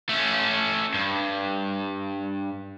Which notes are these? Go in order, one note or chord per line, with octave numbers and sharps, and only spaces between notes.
A3 C#4
G2